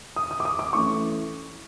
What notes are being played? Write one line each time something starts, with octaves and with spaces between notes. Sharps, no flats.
D#6
D#6
D6
D#6
D6
E3 A3 C#4 E4 C#6